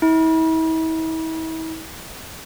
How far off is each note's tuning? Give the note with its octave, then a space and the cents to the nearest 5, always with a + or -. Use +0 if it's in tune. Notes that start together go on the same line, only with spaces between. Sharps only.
E4 -40